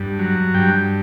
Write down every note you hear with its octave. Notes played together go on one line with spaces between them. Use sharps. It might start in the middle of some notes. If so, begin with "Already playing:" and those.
Already playing: G2
F#3
G2 G5